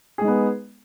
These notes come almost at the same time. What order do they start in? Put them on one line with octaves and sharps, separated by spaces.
G#4 G#3 D#4 B3